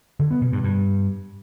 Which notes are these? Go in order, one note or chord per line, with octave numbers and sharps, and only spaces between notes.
D3
B3
B2
G2
G2